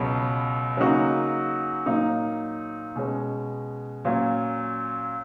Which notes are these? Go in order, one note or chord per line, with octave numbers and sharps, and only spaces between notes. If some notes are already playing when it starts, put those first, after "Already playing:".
Already playing: C#2 B2 F#3 B3
C#3 F#3 A#3 D#4 F#4
A#2 F#3 A#3 D#4
B2 G#3 C#4
A#2 F#3 C#4